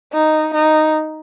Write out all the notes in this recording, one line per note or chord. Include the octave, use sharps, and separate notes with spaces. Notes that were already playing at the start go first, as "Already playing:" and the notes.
D#4
D#4